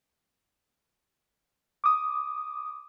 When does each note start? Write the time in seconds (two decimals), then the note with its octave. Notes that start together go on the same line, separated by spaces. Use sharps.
1.84 D6 D#6